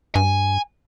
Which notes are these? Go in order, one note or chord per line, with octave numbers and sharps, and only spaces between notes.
G2 G#5